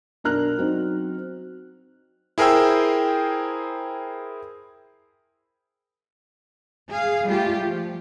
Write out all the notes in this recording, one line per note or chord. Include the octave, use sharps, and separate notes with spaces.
B1 D4 A#4 A#5 F6 F#6
F#3 C4 D#4
E4 G#4 A#4 C5 G5 E6
G#4 F5
G3 A3 F4 G4
F3